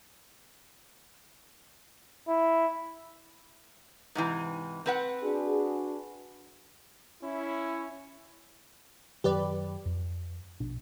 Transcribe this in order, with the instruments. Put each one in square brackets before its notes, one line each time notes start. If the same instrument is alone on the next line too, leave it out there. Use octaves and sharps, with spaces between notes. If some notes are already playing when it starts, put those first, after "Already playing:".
[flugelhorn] E4
[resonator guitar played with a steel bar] G#2 C3 E3
C4 B4 F#5
[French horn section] D4 F#4 G#4
[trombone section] C#4 E4
[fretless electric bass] F#2 D#3 F#3 [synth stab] G4 B4 D5
[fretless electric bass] F2
A#1 B2 D4